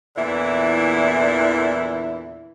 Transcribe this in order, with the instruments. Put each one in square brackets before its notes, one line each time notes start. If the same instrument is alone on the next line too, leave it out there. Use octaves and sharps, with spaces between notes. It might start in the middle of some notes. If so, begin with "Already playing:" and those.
[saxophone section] E2 A#2 D3 E3 E4 E5